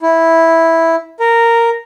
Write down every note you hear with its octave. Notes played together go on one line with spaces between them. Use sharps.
E4
A#4